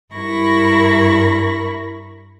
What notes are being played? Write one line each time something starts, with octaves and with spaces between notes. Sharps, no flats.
G2 E4 A#4 B5 C#6 A#6